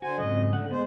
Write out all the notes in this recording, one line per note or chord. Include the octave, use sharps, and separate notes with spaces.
D3 F#4 C5 G#5
F2 G#2 C#3 F#3 D#5
D3 A3 F#5
G#3 B3 G#4 C5